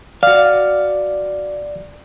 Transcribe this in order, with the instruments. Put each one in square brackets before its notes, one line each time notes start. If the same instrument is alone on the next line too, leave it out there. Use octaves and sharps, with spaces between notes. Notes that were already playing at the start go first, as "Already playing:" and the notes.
[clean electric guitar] F#4 F5 [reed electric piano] D5